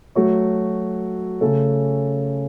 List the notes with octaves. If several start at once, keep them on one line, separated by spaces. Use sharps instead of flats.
F#3 A3 F#4 C#5
C#3 A3 C#4 A4